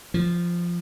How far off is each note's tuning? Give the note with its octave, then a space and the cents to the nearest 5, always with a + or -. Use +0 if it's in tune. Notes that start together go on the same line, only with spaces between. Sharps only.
F3 -5